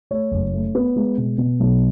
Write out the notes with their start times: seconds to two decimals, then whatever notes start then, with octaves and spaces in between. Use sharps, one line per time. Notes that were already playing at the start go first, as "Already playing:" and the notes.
0.11 A3 C#5
0.31 F#1
0.54 A3
0.75 B3
0.96 G#3
1.18 B2
1.38 B2
1.60 B1